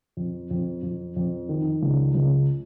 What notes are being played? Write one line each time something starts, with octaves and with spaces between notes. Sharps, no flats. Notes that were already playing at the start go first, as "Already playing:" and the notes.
F2
F2
F2
F2
D#3
C#2
C#2